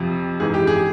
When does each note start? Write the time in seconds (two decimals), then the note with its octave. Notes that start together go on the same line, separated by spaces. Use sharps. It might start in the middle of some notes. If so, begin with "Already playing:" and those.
Already playing: F2 C3 F3
0.40 G#2 E3 G#4
0.54 G4
0.67 G#4